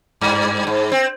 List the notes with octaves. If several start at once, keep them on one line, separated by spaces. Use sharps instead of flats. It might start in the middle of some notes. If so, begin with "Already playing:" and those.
G2
G#2
C4